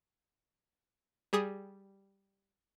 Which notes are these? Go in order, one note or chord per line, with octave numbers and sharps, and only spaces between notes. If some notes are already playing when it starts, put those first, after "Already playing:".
G3 G#4 D#6